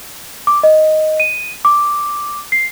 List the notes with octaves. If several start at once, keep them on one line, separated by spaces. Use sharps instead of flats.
D6
D#5
D#7
D6
C7